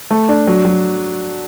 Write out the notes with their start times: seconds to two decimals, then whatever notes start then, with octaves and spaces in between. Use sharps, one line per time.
0.11 A3
0.29 D4
0.47 F#3
0.65 F#3